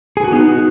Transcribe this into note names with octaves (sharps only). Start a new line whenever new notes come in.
G#4
F#4
B3 D#4
F#4